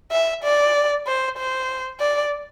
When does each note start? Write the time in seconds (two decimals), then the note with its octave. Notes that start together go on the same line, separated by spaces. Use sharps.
0.12 E5
0.44 D5
1.07 C5
1.38 C5
2.00 D5